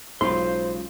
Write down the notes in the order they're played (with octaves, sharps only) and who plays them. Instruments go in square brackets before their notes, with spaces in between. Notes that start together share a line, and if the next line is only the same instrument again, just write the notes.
[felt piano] B1 B5 [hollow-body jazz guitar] C#3 G#3 F4 [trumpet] C5 [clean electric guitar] C6